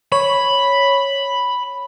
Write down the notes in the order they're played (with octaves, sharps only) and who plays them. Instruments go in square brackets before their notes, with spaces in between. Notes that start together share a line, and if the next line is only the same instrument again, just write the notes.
[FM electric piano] C#5 [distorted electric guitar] B5